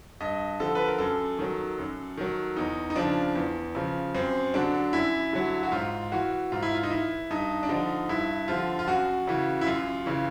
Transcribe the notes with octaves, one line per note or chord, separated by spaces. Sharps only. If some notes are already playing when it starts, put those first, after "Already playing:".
G2 D#5
D3 F3 A4
B4
A#4
F#2 A4
D#3 F#3
F#2
D#3 F#3
E2 D#4
D#4
C#3 F3 D4
E2
C#3 F3
F#2 C4
D3 F#3 D4
F#2 E4
D3 F#3
F#4
G#2 F4
E3 F#4
G#2 F4
E4
F4
D#4
E3 E4
G2 D#4
D4
D3 F3 D#4
G2 E4
D3 F3 F4
F4
F#2 F#4
C#3 E3
E4
F#2 F4
C#3 E3